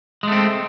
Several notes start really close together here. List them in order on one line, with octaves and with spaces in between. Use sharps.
G#3 A3 C4